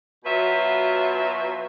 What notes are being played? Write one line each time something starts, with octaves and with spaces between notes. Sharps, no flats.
B2 F#3 F4 B4 E5